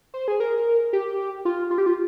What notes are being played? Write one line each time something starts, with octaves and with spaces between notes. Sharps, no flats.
C5
G#4
A#4
G4
F4
F4
G4
F4